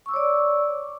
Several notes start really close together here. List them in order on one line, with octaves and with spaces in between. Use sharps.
C#6 E6 D6 C#5 D5